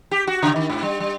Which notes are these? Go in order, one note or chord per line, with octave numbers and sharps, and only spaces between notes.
G4
F#4
C#3
D#3
G#2
G3
G3